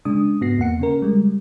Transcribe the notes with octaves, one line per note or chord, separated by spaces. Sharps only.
C#3 G#3 D4 D#6
G#2 B3 F#4 A#6 C7
E2 A#3 F#5 C#7
C#3 C#4 A#4
G3 G#3